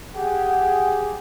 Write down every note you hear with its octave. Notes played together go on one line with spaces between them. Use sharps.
G4 G#4 F#5